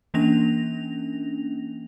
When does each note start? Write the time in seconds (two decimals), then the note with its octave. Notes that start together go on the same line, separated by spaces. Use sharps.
0.14 E3 A#3 C#4 D4 A#6 F7